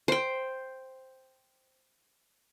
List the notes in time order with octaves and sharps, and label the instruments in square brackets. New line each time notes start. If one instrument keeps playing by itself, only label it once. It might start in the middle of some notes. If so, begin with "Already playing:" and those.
[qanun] C5 G5